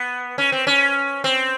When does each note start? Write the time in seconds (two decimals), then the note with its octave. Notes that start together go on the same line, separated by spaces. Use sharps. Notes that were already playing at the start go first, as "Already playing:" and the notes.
Already playing: B3
0.38 C#4
0.52 C4
0.67 C#4
1.24 C4